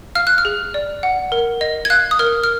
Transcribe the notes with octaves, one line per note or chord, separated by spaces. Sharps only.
F5 F6
F#6
F6
G#4
D5
F#5
A#4
D#5
G#6
F5 F#6
D#6
A#4 F6
F6